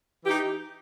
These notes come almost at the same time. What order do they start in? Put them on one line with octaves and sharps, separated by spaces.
E3 G4 D#4